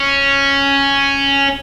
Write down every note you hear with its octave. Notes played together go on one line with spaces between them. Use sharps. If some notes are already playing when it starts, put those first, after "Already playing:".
Already playing: C#4